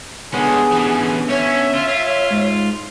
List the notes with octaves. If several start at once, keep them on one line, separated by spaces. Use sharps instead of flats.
D3 G#3 B3 C#4 G#4
E3 C#4
C#4 C#5 E5
F4
G#2